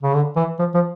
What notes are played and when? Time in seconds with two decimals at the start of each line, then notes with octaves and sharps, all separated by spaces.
0.03 C#3
0.14 D3
0.36 E3
0.59 F3
0.74 F3